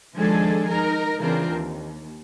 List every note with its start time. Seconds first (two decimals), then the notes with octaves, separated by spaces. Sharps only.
0.16 D#3 F3 G#3 D4 G#4 A4
0.69 D#4 A#4
1.20 C#3 E3 C4 D4 F4 A#4
1.50 D#2